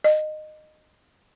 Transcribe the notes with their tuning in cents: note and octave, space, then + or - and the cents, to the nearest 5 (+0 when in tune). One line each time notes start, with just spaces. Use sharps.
D#5 -20